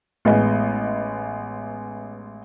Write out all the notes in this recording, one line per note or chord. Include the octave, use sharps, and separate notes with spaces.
A1 G#3 B3 D#5